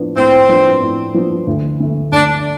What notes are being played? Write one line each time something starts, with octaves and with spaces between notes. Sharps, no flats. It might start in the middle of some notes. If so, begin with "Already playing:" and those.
Already playing: A2 F3 B3 D4
A2 C4
F3 B3 D4
A2
F3 B3 D4
D2
D3 A3
D2 D4